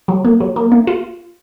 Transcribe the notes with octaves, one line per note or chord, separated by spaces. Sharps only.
F#3
A#3
F#3
A#3
A#3
F4